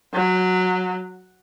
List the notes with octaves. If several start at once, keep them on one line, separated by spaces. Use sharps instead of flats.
F#3